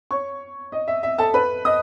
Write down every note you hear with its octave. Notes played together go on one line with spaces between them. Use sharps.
C#5 C#6
D#5
E5
E5
A4 A5
B4 B5
D#5 D#6